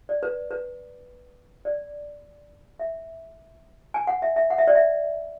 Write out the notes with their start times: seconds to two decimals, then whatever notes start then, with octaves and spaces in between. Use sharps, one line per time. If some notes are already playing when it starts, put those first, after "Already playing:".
0.09 D5
0.23 B4
0.51 B4
1.65 D5
2.80 E5
3.94 G#5
4.07 F#5
4.22 E5
4.36 E5
4.50 F#5
4.58 E5
4.67 D5
4.75 E5